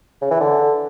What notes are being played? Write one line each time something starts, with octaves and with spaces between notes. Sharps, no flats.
C#3
E3
D3